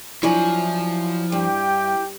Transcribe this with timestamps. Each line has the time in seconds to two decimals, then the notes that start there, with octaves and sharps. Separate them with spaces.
0.23 F3 F#3 D4 E4 G#5
1.32 G2 G4 G5